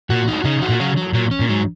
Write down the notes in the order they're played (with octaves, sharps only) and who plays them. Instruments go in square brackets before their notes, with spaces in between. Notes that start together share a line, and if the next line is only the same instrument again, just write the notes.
[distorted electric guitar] A#2 [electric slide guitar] F#4
[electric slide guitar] D#4
[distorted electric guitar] C#3 [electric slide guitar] D#4
[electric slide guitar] F#4
[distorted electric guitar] A#2
[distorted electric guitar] C#3 [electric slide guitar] F#3
[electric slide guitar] F#3
[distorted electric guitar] A#2 [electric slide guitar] F#3
[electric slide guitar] C#4
[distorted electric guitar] A#2
[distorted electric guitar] G#2 [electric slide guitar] F#3